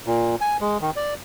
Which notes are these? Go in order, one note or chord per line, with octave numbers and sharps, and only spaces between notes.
A#2
G#5
G#3
D#3
D5